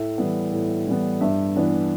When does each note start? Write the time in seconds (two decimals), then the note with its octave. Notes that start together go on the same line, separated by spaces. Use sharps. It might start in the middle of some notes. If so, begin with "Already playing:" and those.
Already playing: A2 E5
0.18 E3 G3 B3
0.53 A2
0.87 E3 G3 B3
1.21 G2 E5
1.56 E3 B3 D4